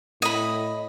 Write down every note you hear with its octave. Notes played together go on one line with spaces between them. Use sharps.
A2 D#5 B5